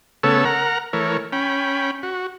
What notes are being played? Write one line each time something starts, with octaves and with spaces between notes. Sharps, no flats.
C#3 A3 B3 A4 C#5 E6
A#4 F#5 A#5
E3 A3 A#4 C#5
C#4 G5 B5
F#4